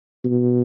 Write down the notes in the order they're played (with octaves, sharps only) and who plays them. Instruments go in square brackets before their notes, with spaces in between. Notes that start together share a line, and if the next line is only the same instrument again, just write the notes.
[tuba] B2